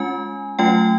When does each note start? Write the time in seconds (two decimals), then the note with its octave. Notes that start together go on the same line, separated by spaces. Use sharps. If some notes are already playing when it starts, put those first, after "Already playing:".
Already playing: G#3 C#4 F4 G#5
0.59 F#3 A3 C#4 F4 G5